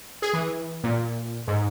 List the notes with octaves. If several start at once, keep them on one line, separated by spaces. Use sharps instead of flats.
G#4
E3
A#2
G#2